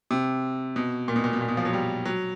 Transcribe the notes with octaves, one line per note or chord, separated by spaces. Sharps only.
C3
B2
A#2
B2
A#2
B2
A#2
B2
F3
F#3
G3
F#3